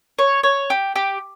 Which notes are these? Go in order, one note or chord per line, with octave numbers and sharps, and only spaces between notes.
C#5
C#5
G4
G4